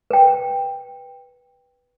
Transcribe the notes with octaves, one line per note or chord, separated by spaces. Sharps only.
B4 G5